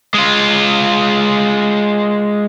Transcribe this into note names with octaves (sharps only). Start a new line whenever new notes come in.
G#3 F4